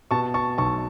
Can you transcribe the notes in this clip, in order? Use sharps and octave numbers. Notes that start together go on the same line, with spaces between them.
B2 A5 C#6
A5 C#6
B1 A5 C#6